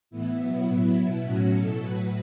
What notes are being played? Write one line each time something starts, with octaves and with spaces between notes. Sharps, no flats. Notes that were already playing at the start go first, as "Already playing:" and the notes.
A2 E3 B3 E4
B2 F#3 B3 E4
A2
F#3
B2 F#3
A2 F#3 C#4 F#4
B2 F#3 E4 A4
A2 F#3 F#4 B4